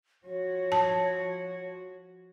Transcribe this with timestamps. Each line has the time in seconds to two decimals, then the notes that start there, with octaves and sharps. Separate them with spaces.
0.24 F3 F#4 C#5
0.72 A5